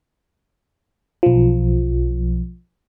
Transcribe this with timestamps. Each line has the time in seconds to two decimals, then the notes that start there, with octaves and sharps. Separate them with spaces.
1.23 B1 F3